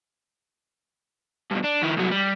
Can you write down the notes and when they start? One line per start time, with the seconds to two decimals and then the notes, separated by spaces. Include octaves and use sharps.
1.51 G2 B2
1.64 D4
1.83 D#3 E4
1.96 C2 F#3
2.11 G3